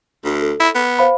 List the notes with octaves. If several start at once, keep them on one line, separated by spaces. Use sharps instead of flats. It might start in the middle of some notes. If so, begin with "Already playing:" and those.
D2
A4
E4
B3
C5 F5 B5